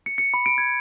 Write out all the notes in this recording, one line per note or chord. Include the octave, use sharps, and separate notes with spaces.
C#7
C#7
B5
D7
G#6